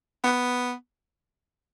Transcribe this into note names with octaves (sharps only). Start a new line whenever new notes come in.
B3